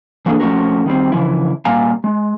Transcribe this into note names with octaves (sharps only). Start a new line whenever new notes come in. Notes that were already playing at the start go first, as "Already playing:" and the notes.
E3 A3 A#3 D4 G#4 A4
F3 A3 A#3 C#4 F#4 A#4
D#3 G3 C4
C#3 E3 F3 E4
A#2 G3 A#3 F5 G#5 A#5
G#3